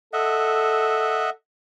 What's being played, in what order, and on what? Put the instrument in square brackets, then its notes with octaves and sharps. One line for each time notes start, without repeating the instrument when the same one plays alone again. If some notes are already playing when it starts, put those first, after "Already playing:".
[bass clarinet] A4 [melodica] D#5 E5 F#5